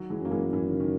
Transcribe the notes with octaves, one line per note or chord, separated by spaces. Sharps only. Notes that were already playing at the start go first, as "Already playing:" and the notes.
Already playing: D#3 F#3
E3 G#3
F#2 A#3
E3 G#3
E3
D#3
C#3
D#3